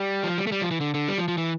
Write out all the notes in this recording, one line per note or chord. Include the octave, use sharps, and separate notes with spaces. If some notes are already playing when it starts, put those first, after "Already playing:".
Already playing: G3
F3
G3
A3
G3
F3
E3
D3
D3
G3
F3
F3
E3